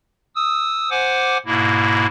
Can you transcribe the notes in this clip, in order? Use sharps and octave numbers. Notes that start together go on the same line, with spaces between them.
D#6 E6
C5 F#5 G#5 D6
G#2 B2 A#3 E4